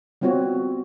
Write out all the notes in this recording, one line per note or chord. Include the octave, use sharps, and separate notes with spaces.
G3 B3 C4 F4 F#4 C#5